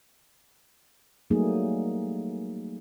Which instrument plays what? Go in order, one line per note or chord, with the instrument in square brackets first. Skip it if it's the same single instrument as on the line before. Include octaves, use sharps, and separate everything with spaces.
[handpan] F#3 G3 A3 A#3 D#4 G#4